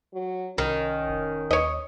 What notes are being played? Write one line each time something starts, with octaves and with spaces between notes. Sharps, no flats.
F#3
C2 D#3 C#4
F1
D#2 C#5 D#5